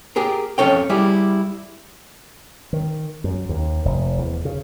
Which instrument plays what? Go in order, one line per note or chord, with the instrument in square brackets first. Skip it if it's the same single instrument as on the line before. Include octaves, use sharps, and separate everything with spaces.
[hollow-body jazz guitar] G4 G#4 A#4
F2 C#4 A4 C#5 G5
G3 E4 G4 G#4
[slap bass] D#3
F#2
D#2
F1
E2
C#3